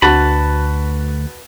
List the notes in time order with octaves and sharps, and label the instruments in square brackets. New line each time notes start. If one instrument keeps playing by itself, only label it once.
[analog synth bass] D2 [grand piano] D4 F#4 [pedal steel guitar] B4 A5 B5